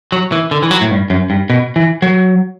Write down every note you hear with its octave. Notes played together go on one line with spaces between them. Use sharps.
F#3
E3
D3
E3
F#3
A2
G2
F#2
G2
B2
E3
F#3